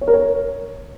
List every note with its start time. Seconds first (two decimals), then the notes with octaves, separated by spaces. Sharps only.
0.01 C#5
0.07 A#4
0.13 C#5